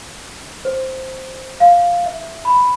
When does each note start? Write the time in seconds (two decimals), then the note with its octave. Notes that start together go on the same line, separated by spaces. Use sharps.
0.65 C5
1.60 F5
2.06 E5
2.45 B5